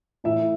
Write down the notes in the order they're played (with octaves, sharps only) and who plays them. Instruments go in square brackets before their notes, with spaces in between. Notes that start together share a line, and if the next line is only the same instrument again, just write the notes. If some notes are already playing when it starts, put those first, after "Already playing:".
[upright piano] A2 E3 E5